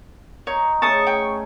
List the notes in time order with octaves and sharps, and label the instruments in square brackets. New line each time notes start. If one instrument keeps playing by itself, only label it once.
[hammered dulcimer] D#4 [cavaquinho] C#5
[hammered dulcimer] A3 C#4 G#4 [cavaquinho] A5 D#6 [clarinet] C#6
[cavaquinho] G5